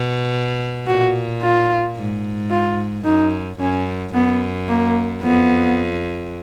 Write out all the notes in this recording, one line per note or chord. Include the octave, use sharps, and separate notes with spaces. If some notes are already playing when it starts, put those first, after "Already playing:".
Already playing: B2
A#2 F#4
F4
G#2
F4
F#2 D#4
F#2 C#4
F#2 B3
A#3
F2 B3